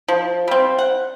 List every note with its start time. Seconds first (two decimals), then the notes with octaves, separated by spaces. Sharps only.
0.08 F3
0.48 G3 C4
0.78 F#5